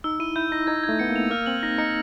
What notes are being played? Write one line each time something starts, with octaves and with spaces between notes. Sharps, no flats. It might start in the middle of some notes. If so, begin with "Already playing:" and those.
D#4 E6
E4 D#7
E4 G6
D#4 A#6
D#4 G#6
G#6
A3
B3 C#7
A#3
F7
A#3 F6
C4 F#7
D#4 A#6
D#4 C#7